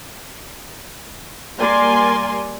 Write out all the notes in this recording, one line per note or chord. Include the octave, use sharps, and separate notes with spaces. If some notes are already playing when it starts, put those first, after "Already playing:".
G3 A#3 A#4 D5 G#5 C6